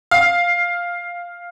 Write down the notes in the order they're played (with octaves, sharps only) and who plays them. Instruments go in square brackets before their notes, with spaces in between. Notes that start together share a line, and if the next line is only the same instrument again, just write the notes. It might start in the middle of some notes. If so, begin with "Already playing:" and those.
[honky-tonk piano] F5